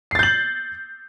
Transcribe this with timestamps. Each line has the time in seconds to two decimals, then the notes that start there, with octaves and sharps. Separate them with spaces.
0.11 C7
0.15 A6
0.19 G6
0.23 F#7